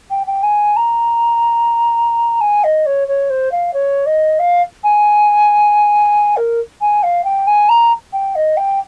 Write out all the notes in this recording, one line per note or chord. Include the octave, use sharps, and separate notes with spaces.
G5
G5
G#5
A#5
G#5
D#5
C#5
C#5
C5
F5
C#5
D#5
F5
G#5
A#4
G#5
F5
G5
G#5
A#5
G5
D#5
G5